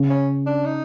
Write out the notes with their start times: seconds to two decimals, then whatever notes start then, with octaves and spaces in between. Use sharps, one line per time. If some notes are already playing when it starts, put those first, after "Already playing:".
Already playing: C#3
0.10 C#4
0.46 D4
0.65 D#4